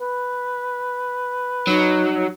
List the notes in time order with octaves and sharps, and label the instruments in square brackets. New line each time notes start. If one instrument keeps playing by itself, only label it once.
[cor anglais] B4
[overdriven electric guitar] F#3 [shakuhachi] D#4